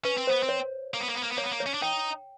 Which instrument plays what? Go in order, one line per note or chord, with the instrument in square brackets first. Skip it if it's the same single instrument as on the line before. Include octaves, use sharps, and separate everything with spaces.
[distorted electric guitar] C#4 [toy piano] B4
[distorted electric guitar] C4
[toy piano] C5
[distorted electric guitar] B3
C4
[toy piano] C#5
[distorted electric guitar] A#3
B3
A#3
B3
A#3
B3
[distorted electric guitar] A#3 [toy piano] C#5
[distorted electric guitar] B3
A#3
[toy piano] C#5
[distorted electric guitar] C#4
D4
[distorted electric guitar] D#4 [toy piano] G5